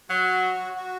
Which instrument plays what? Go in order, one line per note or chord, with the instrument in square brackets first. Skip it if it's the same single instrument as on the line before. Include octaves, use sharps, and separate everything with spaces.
[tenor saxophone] F#3 [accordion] F#4
[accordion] F#4